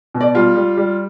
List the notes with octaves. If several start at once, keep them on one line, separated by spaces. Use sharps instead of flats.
B2
D5
G3 F4
G3
G3